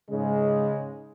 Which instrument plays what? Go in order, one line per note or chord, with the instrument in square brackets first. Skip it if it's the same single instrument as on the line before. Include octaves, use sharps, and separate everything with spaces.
[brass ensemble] G#2 C#3 G#3